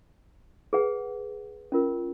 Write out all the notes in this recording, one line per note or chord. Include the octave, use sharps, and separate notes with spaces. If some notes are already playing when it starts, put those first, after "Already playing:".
G#4 B4 F#5
C#4 F4 A#4